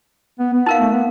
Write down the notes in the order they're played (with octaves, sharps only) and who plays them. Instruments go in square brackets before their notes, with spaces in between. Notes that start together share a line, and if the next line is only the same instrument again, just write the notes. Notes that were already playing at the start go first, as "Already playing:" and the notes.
[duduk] B3
B3
[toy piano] D#4 A#4 F5
[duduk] A3
B3